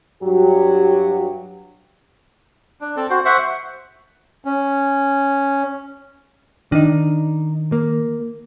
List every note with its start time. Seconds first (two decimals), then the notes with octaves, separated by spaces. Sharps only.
0.23 G2 F#3 G4
2.81 D4
2.97 C4 A4
3.10 F#4 C5
3.25 C5 E5 F#5 C#6
4.45 C#4
6.72 D#3 D4 D#4
7.72 A#3